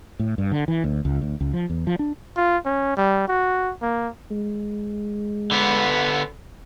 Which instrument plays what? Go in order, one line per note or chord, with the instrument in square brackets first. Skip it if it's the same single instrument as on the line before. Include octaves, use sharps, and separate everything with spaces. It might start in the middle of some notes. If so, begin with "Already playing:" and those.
[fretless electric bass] A2
G2
D3
E3
D2
C#2
D2
C#2
F3
E2
F3
D4
[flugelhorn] F4
C#4
G3
F#4
A#3
[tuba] G#3
[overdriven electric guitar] D3 B3